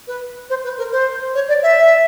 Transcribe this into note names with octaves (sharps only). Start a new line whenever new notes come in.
B4
C5
B4
A#4
C5
C#5
D5
E5